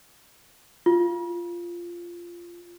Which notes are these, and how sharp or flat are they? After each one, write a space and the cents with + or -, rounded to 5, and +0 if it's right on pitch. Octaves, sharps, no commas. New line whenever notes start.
F4 -10